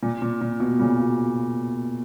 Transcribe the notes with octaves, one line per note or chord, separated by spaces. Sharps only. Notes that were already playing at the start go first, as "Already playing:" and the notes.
A#2
A#2
A#2
B2
A#2 C#3
B2